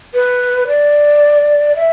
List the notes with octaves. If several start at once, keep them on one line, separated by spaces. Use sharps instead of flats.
B4
D5
E5